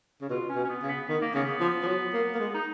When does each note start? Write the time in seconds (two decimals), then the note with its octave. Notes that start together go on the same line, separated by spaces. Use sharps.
0.21 C#3
0.29 B2 F4
0.49 C#4
0.55 B2
0.64 C#4
0.69 B3
0.82 C#3
0.88 B3
1.09 D#3 B3
1.21 A#3
1.34 C#3 B3
1.60 F3
1.83 F3
1.87 F#3
2.13 A#3
2.34 A#3
2.39 G#3
2.54 D#4